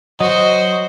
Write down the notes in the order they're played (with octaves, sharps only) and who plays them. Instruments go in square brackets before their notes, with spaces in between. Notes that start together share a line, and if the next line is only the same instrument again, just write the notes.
[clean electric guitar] F#3 [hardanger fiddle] F#4 C5 [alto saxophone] D#5